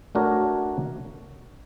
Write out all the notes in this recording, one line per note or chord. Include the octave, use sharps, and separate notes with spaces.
A3 D4 F#4 A#4 C#5